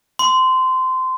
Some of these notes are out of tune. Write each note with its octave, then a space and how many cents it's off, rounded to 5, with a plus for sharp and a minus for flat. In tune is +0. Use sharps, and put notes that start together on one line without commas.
C6 -20